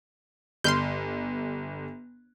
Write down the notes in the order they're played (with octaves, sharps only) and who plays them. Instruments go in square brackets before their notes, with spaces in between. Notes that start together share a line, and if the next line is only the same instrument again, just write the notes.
[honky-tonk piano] G1 [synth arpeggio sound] C6 F6 G6